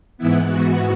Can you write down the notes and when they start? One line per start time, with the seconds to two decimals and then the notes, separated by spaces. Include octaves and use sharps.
0.18 G#2 E3 B3 E4
0.48 F#4